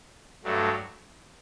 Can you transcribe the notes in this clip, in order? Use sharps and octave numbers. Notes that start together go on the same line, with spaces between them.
G2 F#3 A3